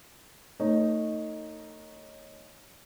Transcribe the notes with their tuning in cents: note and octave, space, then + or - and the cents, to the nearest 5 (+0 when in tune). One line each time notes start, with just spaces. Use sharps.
A3 +35 D#4 +0 C#5 -15